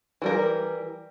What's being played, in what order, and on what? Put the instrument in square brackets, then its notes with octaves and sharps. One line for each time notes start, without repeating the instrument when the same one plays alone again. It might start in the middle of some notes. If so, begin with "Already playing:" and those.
[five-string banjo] E3 G3 A#4